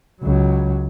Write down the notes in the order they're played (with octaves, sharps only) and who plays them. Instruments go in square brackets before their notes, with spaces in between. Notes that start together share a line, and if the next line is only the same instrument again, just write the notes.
[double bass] C#2 F#3